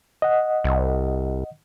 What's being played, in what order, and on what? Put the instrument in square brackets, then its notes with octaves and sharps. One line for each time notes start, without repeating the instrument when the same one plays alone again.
[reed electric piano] D#5 F#5
[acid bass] C2